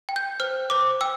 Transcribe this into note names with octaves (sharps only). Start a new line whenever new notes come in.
G5
G6
C5 F6
C5 D6
G5 E6